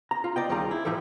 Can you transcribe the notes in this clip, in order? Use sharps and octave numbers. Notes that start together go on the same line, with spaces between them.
A#5
F4
D5 D#5 G5
C#2 D#3 G3 F4 G#4 A#5
E4
A2 E3 F3 G3 A4